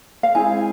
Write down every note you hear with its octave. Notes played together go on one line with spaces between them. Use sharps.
F5
G#3 C4 E4 G#4 G#5